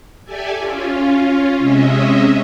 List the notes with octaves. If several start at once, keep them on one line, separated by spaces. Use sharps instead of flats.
G4 A4 D5 E5 G#5
C#4 F4
C3 G#3 C#4 D#5 E5